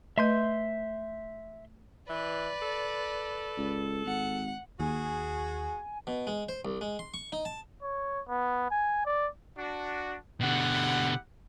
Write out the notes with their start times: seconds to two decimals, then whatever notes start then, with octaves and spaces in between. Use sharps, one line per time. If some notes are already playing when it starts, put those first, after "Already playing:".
0.18 A3 B4 D#5 E5 C6 G6
2.09 E3 B4 D5
2.62 A4
3.57 C#2
4.06 G#1 F#5
4.80 D#2 F#4 G#4 G#5
6.07 B2
6.27 G#3
6.49 C5
6.65 C2
6.81 G#3
6.99 C6
7.14 C#6
7.32 D#4
7.45 A5
7.82 C#5
8.29 B3
8.71 G#5
9.06 D5
9.56 D4 F#4
10.41 B2 D3 E4 G4 F#5